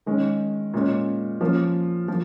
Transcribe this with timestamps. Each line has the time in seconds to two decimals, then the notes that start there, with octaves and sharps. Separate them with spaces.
0.06 D#3 G#3 C#4
0.74 A#2 G#3 C#4
1.41 F3 A#3 C#4
2.08 F3